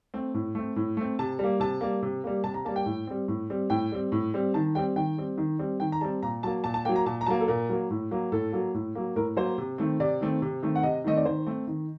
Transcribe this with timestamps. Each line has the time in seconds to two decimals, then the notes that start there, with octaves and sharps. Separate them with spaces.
0.14 A3 C4
0.34 A2
0.55 A3 C4
0.76 A2
0.97 A3 C4
1.19 C3 A5
1.39 G3 A#3
1.60 C3 A5
1.81 G3 A#3
2.02 C3
2.24 G3 A#3
2.44 C3 A5
2.54 A#5
2.65 G3 A#3 A5
2.76 G5
2.86 A2
3.07 G3 C4
3.28 A2
3.50 G3 C4
3.70 A2 G5
3.92 G3 C4
4.12 A2
4.34 G3 C4
4.54 D#3 A5
4.75 G3 C4 G5
4.96 D#3 G5
5.18 G3 C4
5.38 D#3
5.59 G3 C4
5.80 D#3 G5
5.92 A#5
6.01 G3 C4 A5
6.23 A#2 A#5
6.43 F#3 A#3 A5
6.64 A#2 A5
6.74 A5
6.85 F#3 A#3 G5
6.96 A#5
7.06 A#2 A5
7.21 A#5
7.26 F#3 A#3 A5
7.40 A4
7.48 A#2 A#4
7.69 F#3 A#3
7.91 A2
8.11 F#3 A#3
8.32 A2 A4
8.52 F#3 A#3
8.74 A2
8.95 F#3 A#3
9.16 A2 A#4
9.37 F#3 A#3 C5
9.58 C3
9.78 D#3 A3 C4
10.00 C3 D5
10.21 D#3 A3 C4
10.42 C3
10.63 D#3 A3 C4
10.75 F#5
10.83 C3 D#5
11.04 D#3 A3 C4 D#5
11.17 D5
11.25 D#3 C5
11.47 A3 C4
11.67 D#3